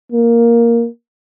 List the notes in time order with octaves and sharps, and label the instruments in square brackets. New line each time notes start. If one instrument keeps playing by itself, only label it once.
[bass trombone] A#3